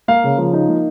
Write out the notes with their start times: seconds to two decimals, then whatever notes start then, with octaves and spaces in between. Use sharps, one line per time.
0.08 A#3 F5
0.24 C#3
0.38 F3
0.53 D#4
0.68 A#3